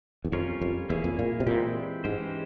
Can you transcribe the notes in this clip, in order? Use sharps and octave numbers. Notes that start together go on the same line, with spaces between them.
E2
F2 G3 C#4 F4 A#4 C#5
F2
E2 A#3 E4 G#4 C#5
F2
A#2
C3
A#2 E3 G#3 C4 E4 G4
G#2 E3 G#3 C#4 G4 C5